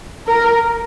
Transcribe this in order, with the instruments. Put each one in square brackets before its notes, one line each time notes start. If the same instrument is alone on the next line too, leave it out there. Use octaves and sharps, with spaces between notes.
[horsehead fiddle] A#4